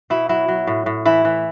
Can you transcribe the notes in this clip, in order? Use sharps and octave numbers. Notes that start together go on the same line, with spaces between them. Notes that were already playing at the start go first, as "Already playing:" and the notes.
B2 E4
F#3 E4
F#3
A2
A2
E3 E4
E3